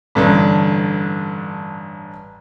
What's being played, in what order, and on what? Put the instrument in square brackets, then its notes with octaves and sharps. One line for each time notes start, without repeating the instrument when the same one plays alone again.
[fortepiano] A1 G2 D3